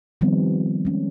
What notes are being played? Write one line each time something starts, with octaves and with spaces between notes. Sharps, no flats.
D#3 F3 G3 B3 C4
G#3 C#4